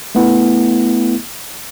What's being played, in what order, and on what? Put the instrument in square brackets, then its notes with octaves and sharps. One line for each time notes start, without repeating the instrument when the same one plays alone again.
[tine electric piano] A3 B3 E4